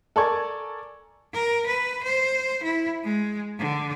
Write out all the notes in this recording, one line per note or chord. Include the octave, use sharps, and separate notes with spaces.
A4 A#4 D5 G#5 C#6 G#6
A#4
B4
C5
E4
G#3
D3